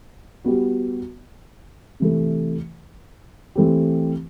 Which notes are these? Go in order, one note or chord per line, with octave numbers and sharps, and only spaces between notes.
G3 B3 F#4
C3 E3 A3
E3 A3 C4 G4